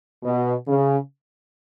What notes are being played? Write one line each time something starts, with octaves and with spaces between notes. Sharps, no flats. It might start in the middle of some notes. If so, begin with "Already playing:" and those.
B2
C#3